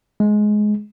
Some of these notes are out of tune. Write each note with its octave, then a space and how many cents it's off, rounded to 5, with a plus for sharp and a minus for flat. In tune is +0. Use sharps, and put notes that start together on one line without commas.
G#3 +15